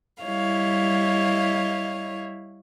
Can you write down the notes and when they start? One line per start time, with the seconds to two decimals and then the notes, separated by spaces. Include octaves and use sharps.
0.23 G3 E4 C#5 D#5 F5